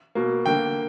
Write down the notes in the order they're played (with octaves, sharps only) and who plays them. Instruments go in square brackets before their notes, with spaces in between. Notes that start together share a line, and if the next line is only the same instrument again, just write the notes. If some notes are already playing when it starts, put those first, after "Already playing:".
[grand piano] B2 A#3
D3 A#3 G5